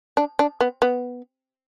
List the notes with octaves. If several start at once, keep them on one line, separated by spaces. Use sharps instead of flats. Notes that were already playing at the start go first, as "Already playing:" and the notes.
D4
D4
B3
B3